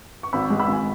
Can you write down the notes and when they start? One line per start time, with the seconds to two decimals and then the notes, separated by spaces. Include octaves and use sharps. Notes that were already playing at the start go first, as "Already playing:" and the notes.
0.23 C#6
0.33 G#1 B5 E6
0.50 G#3
0.60 B5 E6
0.67 G#1 G#5